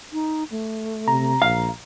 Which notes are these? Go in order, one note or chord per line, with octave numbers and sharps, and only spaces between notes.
D#4
A3
C3 A#5
A#1 F5